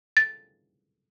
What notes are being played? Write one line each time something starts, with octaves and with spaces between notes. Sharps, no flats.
A6